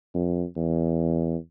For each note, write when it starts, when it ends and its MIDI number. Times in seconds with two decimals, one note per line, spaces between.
0.14 0.45 41
0.57 1.36 40